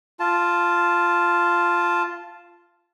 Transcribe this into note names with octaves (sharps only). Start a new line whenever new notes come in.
F4 A5